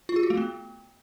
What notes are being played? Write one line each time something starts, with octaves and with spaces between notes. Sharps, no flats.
F4
G#4
F#4
A3
B3